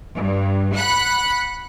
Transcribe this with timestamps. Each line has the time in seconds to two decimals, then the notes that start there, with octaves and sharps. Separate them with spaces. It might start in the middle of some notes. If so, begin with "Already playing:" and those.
0.16 G2
0.76 F#5 B5 F#6